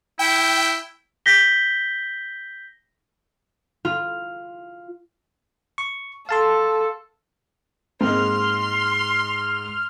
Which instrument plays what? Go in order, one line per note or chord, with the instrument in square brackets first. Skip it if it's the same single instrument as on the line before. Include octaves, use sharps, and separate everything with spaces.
[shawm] E4 [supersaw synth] G5
[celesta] G6 A#6 B6 G7
[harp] F4
[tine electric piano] C#6
[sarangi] A4 [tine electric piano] F5 A5 C6
[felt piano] G#2 [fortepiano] G#3 A#3 C4 [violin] C6 [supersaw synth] F6